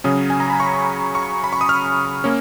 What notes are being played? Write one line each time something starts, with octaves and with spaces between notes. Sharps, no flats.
C#3 F#3 C#4 D#6
G#5
A#5
B5
C#6
C#6
B5
C#6
D#6
F6
A#3 C#4